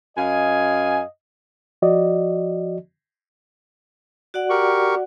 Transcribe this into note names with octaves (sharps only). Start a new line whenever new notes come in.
F#2 D#5 F5 G#5
F3 F#4 D5 D#5
F#4 D5 F#5
G4 A#4 C#6